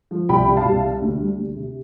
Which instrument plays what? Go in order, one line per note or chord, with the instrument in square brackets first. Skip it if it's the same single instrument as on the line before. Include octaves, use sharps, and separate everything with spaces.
[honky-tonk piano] F3
C2 G5 B5
C3
F5 A5
C2
C3
D2
G3
D2
C3